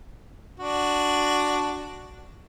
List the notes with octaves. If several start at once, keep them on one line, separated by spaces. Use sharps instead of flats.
D4 F#4